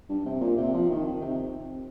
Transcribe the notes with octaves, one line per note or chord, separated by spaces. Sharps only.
G2
C3
A#2
C3
F3
D#3
D#3
C3